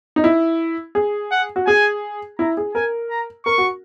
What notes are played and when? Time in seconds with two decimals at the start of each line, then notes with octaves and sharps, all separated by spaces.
0.16 D#4
0.24 E4
0.95 G#4
1.32 F#5
1.56 F#4
1.66 G#4 G#5
2.39 E4 A#5
2.57 G#4
2.75 A#4 G#5
3.10 A#5
3.46 A#4 C#6
3.58 F#4